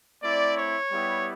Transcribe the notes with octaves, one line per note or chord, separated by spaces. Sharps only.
A3 C4 E4 D5
C#5
G3 B3 E4 G4